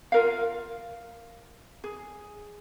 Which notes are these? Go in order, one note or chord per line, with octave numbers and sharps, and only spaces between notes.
F4 A#4 F5
G#4